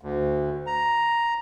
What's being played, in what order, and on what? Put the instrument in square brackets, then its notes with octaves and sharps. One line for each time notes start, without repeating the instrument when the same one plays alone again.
[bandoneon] D2
A#5